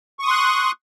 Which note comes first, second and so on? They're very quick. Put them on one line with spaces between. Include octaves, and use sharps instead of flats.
C#6 D#6 C6 F#6